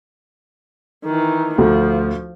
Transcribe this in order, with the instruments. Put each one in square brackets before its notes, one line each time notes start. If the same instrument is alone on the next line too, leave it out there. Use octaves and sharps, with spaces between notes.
[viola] D#3 E3
[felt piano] D2 [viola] F3